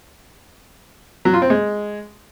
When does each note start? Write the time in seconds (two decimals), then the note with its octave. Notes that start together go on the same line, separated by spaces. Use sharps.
1.25 F#3
1.34 F4
1.42 C4
1.50 G#3